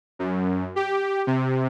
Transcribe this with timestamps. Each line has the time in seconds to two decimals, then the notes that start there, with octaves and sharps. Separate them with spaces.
0.19 F#2
0.76 G4
1.27 C3